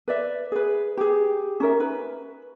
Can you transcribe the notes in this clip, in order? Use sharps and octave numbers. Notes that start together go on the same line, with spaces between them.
B4 D5 E5
G#4 B4
G4 G#4
C#4 D#4 A#4 E5
B4